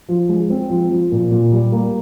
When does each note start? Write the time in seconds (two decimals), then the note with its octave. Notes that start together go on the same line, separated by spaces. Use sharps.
0.09 F3
0.29 G#3
0.50 C4
0.70 F3
0.90 F3
1.12 A#2
1.32 A#2
1.52 G3
1.72 A#3